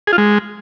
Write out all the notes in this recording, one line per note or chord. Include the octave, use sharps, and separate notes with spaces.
G#4
F4
G#3